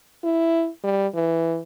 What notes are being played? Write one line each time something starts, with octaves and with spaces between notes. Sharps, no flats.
E4
G3
E3